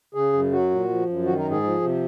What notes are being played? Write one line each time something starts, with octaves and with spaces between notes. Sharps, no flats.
C#3 G#4
F#2
F#3 F#4
A#2
F3
F#2
D#3 F#4
A#4
G#2
G#4
F3
C3